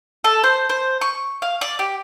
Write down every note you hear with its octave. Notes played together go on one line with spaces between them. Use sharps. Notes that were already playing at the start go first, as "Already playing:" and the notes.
A4
C5
C5
C#6
F5
D5
G4